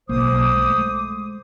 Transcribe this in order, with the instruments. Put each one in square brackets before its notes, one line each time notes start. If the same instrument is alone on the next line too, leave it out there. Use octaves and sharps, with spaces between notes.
[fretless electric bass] B1 A#3 [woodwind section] C5 D6 D#6
[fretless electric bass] G#3 A3